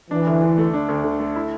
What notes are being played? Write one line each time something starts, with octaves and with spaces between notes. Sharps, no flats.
E3 D4
D2
D3
A3
D4
D2
D3
A3
E4